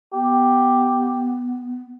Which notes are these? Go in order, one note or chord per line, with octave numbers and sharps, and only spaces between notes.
B3 G4